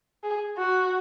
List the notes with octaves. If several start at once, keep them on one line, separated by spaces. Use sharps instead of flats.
G#4
F#4